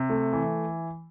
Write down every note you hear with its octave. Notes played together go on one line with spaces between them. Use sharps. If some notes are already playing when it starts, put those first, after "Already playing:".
Already playing: C3
A3
E3